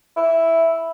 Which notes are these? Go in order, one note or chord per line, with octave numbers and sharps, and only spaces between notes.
E4